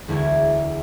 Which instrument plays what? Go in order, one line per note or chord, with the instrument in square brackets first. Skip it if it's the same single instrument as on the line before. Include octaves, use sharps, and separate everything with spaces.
[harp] E1 D2 G#3 E4 G#6